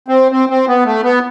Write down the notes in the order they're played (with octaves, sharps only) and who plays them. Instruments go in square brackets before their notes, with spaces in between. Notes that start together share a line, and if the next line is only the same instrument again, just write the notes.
[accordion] C4
C4
C4
B3
A3
B3